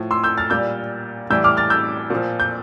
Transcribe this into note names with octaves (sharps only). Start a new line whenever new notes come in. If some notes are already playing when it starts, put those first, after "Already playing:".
Already playing: A2 F3
C6 E6
E6 G6
F6 A6
A#2 G3 E6 G6
A2 E3 G3 E6 G6
D6 F6
F6 A6
E6 G6
A#2 F3
G6